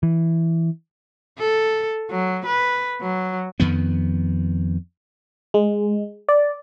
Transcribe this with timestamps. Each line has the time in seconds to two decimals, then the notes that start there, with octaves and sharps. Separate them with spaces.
0.03 E3
1.38 A4
2.10 F#3
2.45 B4
3.01 F#3
3.60 F2 D#3 B3
5.54 G#3
6.28 D5